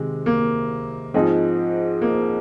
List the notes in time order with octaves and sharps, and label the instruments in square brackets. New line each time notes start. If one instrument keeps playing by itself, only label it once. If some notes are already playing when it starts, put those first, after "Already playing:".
Already playing: [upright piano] C3 D#3 [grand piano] G#3
[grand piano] A#3
[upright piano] G#2 F3 C4 D#4 G#4
[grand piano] A#3